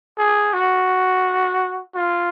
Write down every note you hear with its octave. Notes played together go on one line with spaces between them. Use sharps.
G#4
F#4
F4